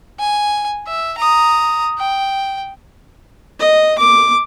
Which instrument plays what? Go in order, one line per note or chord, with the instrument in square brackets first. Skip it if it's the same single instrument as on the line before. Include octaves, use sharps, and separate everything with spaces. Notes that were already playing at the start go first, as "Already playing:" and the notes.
[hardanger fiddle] G#5
E5
A#5 D#6
G5
[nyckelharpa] D#5
D6